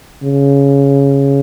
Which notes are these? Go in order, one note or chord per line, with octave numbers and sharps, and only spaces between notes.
C#3